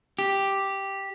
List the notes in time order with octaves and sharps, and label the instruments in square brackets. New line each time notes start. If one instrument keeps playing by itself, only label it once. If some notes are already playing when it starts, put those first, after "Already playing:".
[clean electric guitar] G4